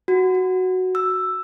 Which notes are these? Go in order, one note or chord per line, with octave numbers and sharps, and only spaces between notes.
F#4
F#4
E6